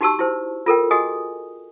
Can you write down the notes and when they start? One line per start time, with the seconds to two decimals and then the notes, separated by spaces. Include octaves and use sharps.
0.01 D#4 F#4 G4 A5 C#6 E6
0.19 E4 C5
0.66 F4 A4 A#4 G5
0.91 F#4 G#4 D#5 G#5 D#6